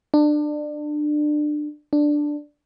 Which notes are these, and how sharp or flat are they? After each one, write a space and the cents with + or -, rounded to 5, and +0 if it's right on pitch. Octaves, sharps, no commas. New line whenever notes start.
D4 +25
D4 +5